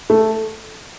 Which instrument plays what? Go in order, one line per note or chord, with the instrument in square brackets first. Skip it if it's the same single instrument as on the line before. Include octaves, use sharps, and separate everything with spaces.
[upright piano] A3